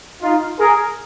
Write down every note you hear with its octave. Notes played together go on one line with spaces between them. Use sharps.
D#4 F4
G#4 A#4